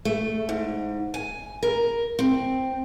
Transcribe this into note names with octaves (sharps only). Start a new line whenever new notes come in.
A3
G#2
G#5
A#4
C4